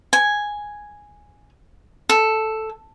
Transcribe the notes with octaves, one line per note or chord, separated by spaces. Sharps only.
G#5
A4